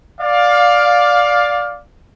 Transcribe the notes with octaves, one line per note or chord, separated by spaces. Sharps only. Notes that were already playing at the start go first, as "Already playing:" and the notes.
D5 F5